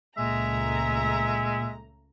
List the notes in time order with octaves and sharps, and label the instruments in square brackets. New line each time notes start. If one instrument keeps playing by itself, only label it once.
[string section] C#2 A3 A#5 [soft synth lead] A#2 [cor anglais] G#3 [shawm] E5